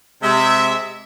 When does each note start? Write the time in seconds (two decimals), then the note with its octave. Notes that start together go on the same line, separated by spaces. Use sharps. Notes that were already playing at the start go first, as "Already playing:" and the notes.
0.23 C3 G#3 E5